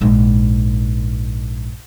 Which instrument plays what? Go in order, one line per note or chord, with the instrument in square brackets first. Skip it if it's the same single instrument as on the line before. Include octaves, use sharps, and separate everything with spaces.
[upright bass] A#1 G#2